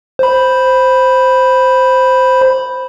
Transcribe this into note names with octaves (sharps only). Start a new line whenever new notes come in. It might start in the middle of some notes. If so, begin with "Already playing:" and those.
C5 B5